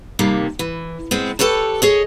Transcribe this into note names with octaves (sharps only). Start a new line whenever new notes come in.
D#2 C3 G3 A#3
E3
G#3 B3 C4
G4 A4 B4 C#5 A5
G#4 C#5 D#5